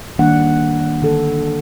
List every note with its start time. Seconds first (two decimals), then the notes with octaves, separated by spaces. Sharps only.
0.19 D#3 G3 A#3 D4 F#5
1.02 D3 A4